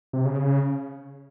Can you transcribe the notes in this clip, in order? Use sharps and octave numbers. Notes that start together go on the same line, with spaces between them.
C3
C#3